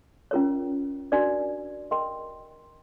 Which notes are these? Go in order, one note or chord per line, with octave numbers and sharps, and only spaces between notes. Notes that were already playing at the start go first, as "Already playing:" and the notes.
C#4 F4 A#4 C#5
D4 F#4 A#4 D5
A#4 D#5 G5 C6